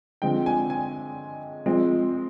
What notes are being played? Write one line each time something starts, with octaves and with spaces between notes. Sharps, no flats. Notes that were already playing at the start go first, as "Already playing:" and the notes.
D3 F3 G#3 C4 G5
G#5
G#5
F3 G#3 C4